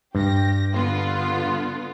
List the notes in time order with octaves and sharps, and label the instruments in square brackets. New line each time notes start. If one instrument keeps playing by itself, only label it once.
[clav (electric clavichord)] G2 [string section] G4 A#6
[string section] D3 B3 F4